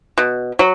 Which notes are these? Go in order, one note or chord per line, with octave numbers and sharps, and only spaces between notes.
B2
F#3